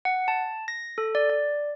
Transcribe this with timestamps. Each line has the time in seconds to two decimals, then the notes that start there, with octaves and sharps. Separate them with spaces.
0.05 F#5
0.28 A5
0.68 A#6
0.98 A4
1.15 D5
1.30 D5